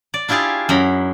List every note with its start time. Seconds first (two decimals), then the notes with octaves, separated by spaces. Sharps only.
0.14 D5
0.28 D4 E4 F4 G4 G#4
0.69 F#2 A#5 B5